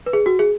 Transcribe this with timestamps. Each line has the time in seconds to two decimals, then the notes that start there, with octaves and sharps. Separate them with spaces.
0.06 B4
0.13 G#4
0.26 F#4
0.39 G#4